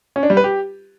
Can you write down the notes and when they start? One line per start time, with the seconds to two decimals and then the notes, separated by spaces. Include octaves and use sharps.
0.16 C#4
0.23 D4
0.30 G3
0.37 B4
0.44 G4